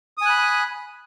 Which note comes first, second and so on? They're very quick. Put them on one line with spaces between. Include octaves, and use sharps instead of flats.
D#6 G#5 F#6 B5